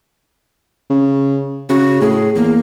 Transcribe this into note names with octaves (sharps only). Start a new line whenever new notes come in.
C#3
C#3 F#4
A2 G#4
E2 A#3